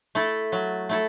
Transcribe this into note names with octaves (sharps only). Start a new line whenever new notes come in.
A3 E4 A4
F#3
A3 E4 A4